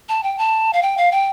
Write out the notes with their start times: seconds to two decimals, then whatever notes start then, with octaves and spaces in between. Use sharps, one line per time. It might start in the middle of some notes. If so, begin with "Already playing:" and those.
0.09 A5
0.23 G5
0.38 A5
0.73 F5
0.82 G5
0.98 F5
1.12 G5